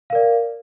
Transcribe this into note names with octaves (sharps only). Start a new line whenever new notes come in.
A#4 D5 F5